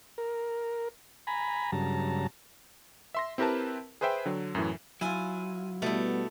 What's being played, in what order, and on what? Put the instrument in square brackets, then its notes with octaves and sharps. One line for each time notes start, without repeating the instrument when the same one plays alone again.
[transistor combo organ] A#4
G#5 A#5 B5
G2 C#3 F#3 A5 A#5
[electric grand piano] E5 C6 A#6
C4 E4 G4 A#4 B4 A5
G#4 B4 C5 E5 G5
D3 F#3
F#2 A2 E3
[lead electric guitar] F#3 [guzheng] E4 F4 [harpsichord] G#5
[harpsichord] B2 [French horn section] G3 B3 [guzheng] A3 E4